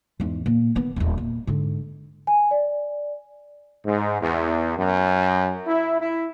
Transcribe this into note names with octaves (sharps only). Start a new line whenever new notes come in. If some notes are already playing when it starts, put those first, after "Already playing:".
E2 G#2
A#2
D#3 B3
D#1 D#2
A#2
G#2 D3
G#5
D5
G#2
E2
F#2
E4
E4